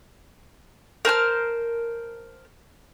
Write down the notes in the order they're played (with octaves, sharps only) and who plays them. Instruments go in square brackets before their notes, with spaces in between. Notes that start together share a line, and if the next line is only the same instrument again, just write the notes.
[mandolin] A#4 C5 A5 F6